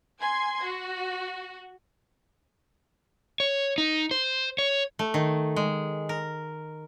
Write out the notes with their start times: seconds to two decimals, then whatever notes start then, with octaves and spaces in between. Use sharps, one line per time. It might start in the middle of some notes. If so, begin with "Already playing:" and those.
0.20 G#5 C6 G#6
0.63 F#4
3.40 C#5
3.78 D#4
4.11 C5
4.59 C#5
4.99 A3
5.14 D#3
5.56 G#3
6.09 A#4